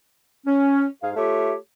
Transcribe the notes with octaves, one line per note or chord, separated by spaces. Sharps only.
C#4
G#2 G#4 F5
A3 F4 G4 C#5 E5